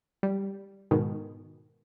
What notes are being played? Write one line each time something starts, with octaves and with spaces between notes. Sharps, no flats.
G3
G#2 B2 D#3